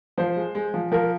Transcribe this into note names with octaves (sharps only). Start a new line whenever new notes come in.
F3 C5
G#3
G#3
F3
F3 A#4